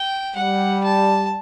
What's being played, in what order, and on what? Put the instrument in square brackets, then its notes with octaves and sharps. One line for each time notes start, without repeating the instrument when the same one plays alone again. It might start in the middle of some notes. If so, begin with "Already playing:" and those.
Already playing: [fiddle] G5
[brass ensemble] G3 [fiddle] F#5
[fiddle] A5